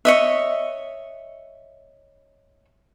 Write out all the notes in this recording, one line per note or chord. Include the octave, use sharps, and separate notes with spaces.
C#5 D#5 E5